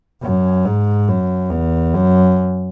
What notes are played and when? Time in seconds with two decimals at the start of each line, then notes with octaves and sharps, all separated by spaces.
0.23 F#2
0.65 G#2
1.08 F#2
1.51 E2
1.94 F#2